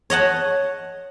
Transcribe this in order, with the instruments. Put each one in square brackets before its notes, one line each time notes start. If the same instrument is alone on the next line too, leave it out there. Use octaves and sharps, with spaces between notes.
[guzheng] C#5 D#5 F#5 A5